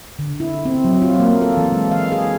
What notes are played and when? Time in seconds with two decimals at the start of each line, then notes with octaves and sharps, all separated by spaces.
0.19 D3
0.40 E4
0.65 C4
0.85 F#3
1.02 F4
1.20 A#3
1.42 A4
1.57 E3
1.72 G#3
1.91 F5
2.12 G#4